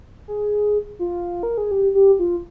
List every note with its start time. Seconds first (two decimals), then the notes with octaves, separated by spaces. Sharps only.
0.28 G#4
0.99 F4
1.43 A#4
1.58 G#4
1.71 G4
1.95 G4
2.19 F4